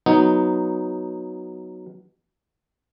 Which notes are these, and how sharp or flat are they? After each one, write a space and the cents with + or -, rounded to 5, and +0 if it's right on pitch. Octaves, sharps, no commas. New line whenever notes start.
F#3 +0 B3 +0 D#4 +0